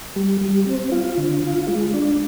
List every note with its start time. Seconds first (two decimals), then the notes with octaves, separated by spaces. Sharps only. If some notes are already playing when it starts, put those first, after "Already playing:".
0.16 G3
0.41 G3
0.66 C4
0.92 F4
1.18 D3
1.44 F4
1.68 G#3
1.94 D4